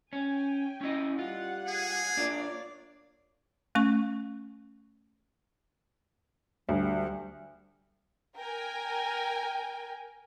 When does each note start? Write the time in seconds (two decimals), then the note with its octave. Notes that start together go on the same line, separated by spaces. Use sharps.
0.13 C#4 G5 G#5
0.81 C#4 E4 D#5
1.19 G3 F4 F#5
1.66 G#4
2.17 A#3 D4 F4 C#5 D5
3.75 A3 C#4 C#6
6.69 D2 G3
8.37 A#4 G5 G#5